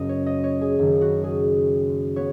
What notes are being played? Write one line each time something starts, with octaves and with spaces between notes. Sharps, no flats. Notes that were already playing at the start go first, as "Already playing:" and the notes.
Already playing: F#1 F#2 F#3 D#5
C#5
D#5
C#5
G#4
F#1 F#2 D#3
F#4
G#4
B3 C#5